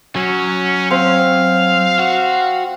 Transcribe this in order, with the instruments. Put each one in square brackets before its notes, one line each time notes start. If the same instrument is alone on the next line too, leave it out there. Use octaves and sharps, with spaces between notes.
[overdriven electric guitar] F#3 [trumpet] C#4
[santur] C4 [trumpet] F5
[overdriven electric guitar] F#4